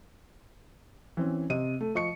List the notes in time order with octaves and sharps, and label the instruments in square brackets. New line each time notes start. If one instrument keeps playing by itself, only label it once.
[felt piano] E3 C4 C#4
C3 D#5 D#7
A3
F3 D#5 C#6 C#7